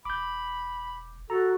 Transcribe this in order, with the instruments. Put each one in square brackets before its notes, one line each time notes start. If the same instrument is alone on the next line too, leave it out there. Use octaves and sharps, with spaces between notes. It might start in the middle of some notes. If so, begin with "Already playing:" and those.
[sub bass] E1 [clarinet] B5 [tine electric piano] D6 G6
[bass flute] F#4 [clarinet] A4 [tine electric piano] A#5